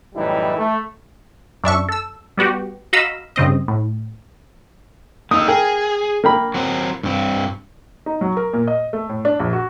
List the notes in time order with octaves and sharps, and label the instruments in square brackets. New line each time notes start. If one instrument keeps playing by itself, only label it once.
[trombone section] F#2 A2 E3 G3 D#4 E4
A3
[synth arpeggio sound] F#2 D4 E5 C#6
A4 E6
G3 B3 F#4 G4
F#4 D#5 F5 A#5 B5 E6
G2 C#3 C4 D#5
A2
[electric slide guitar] A#3 D#4 [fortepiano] D#6 E6
[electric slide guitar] G#4 [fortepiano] A#4 G5
[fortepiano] A#3 G5 B5
[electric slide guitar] F#3 C4 C5
G2 C4
[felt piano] D#4
F#3
A#4
A#2
D#5
A3
A2
D4
A#1
F#4